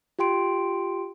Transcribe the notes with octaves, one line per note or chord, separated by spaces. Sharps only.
F4 G4 G5 C6 D7